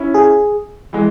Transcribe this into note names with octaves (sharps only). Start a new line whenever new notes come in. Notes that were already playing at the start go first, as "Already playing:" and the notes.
Already playing: C#4 E4
G#4
E3 G#3